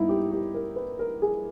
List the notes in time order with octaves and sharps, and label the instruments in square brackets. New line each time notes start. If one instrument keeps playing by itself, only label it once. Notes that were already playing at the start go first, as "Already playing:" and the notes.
Already playing: [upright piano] G2 G3 B3 D#4 E4
G4
G4
A#4
B4
A#4
G#4